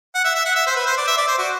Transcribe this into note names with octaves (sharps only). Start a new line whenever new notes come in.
F#5
E5
E5
F#5
E5
C5
B4
C5
D5
E5
D5
C5
F#4